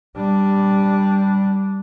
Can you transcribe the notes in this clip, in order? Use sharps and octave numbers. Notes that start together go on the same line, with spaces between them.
G3 D4